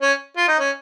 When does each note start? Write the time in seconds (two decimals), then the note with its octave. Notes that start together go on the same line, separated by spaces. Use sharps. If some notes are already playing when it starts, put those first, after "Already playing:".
0.02 C#4
0.37 F4
0.48 D#4
0.59 C#4